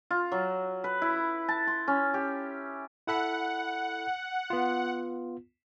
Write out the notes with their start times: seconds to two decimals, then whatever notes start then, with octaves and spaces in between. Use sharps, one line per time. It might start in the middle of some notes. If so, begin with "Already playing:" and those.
0.11 F4
0.32 F#3
0.84 B4
1.02 E4
1.49 A5
1.67 C6
1.88 C#4
2.14 G4
3.07 E4 A4 F#5 B5
4.50 B3 F4